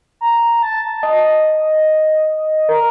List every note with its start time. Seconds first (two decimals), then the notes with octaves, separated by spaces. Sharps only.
0.21 A#5
0.63 A5
1.03 D#5
2.69 A#4